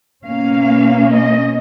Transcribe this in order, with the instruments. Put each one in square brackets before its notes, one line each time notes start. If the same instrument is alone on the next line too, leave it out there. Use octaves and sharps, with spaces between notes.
[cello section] B2 A#3 C#4 F5
D#5